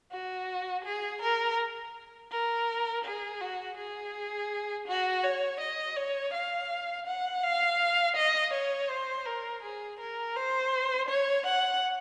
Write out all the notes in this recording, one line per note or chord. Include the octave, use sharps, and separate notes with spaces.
F#4
G#4
A#4
A#4
G#4
F#4
G#4
F#4
C#5
D#5
C#5
F5
F#5
F5
D#5
C#5
C5
A#4
G#4
A#4
C5
C#5
F#5